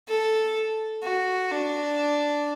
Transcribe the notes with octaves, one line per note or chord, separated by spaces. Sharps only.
A4
F#4
D4